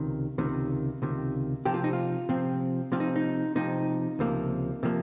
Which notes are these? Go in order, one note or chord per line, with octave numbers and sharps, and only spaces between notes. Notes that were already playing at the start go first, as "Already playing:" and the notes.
Already playing: C#2 C3 D#3
C#2 C3 D#3
C#2 C3 D#3
C3 F3 C4 G4
F4
D#4
F4
C3 F3 C4
C3 F3 C4 F4
D#4
D#4
C3 F3 C4 D#4
C#2 C3 F3 A#3
C3 F3 A#3